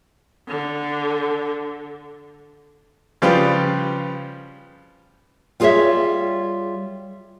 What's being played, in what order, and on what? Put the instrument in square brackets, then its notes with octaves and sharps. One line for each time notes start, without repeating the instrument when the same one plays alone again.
[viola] D3
[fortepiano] C#3 F3 G3 F4 G4 B4
[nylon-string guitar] G3 F4 G#4 C5 C#5 E5